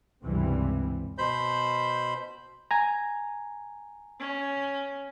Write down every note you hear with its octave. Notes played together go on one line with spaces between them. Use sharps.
C#2 G2 C3 E3 G3 C4
B2 C5 B5 G6
G#5 A#5
C#4